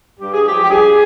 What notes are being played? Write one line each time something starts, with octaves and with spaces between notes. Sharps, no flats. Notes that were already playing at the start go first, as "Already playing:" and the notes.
G2 G4
G#4
F3 G#3 G4
G4
G2 G#4